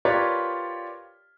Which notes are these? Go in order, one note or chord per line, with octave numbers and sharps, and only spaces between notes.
F4 G4 A#4 B4 C#5 D5